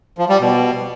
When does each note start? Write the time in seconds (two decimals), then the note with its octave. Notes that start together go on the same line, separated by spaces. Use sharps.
0.18 F3
0.29 G3
0.40 B2